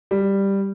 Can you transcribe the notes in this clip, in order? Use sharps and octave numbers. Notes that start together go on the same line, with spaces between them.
G3